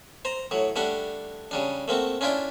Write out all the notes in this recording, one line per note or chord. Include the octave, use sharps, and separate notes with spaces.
C5 A#5
A2 F#3
G3 A3 D4 G4 F#5
C#3 G3 D4
A3 A#3 C4 F#4
C#4 D4 E4 F4 D5 G5